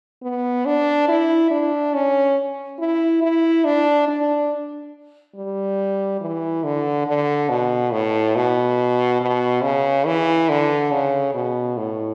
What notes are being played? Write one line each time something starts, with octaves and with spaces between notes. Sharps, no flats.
B3
D4
E4
D4
C#4
E4
E4
D4
D4
G3
E3
D3
D3
B2
A2
B2
B2
C#3
E3
D3
C#3
B2
A2